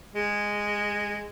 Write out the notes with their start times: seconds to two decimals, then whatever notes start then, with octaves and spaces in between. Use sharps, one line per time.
0.15 G#3